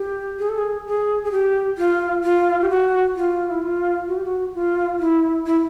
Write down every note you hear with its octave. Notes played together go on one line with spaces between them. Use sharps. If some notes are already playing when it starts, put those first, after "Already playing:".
Already playing: G4
G#4
A4
G#4
G#4
G#4
G4
F4
F4
G4
F#4
F4
E4
F4
F#4
G4
F#4
F4
E4
E4